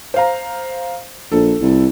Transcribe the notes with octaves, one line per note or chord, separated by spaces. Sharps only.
C5 F5 A#5
A#1 A4
C2